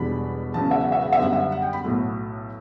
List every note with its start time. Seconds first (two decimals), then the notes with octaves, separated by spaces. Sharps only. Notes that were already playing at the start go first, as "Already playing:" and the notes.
Already playing: E1 E2 B2 G3 D4 B5
0.54 E1 E2 C#3 F#3 A5
0.71 E5
0.81 F#5
0.92 E5
1.02 F#5
1.12 E5
1.19 F#2 D3 G3 F#5
1.33 E5
1.52 F#5
1.62 G5
1.73 B5
1.84 B1 A2 F#3 A3